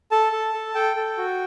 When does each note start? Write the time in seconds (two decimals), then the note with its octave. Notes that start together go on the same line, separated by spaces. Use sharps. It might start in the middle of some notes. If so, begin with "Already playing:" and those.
0.11 A4 A5
0.32 A4
0.54 A4
0.75 A4 G5
0.96 A4
1.18 F#4